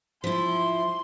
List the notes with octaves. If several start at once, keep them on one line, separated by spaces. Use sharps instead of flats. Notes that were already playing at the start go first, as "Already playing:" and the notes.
F3 E4 C6